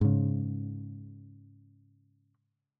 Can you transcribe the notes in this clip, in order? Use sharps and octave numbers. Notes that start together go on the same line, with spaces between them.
G#2 C#3